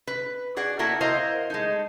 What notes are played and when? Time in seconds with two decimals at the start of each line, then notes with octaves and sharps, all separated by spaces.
0.07 B4
0.57 F#4 G#4 D5 F#5
0.79 A#3 B3 E4 F#4 A4 A#4
1.01 E4 A#4 C5 D#5 F5
1.50 G#3 A3 D#4